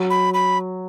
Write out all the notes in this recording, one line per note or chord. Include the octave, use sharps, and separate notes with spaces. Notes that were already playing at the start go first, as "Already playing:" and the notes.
Already playing: F#3
B5
B5